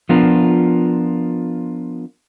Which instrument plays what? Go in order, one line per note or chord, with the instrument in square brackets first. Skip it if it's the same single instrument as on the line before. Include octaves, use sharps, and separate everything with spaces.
[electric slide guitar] F3 B3 D4 F4 A#4